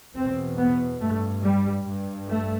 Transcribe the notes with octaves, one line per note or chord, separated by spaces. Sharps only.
E2 B2 C4
B3
G2 A3
G3
G2
A3